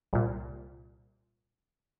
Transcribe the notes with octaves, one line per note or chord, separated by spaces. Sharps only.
C2 A#2